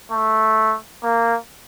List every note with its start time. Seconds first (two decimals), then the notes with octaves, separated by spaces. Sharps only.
0.11 A3
1.03 A#3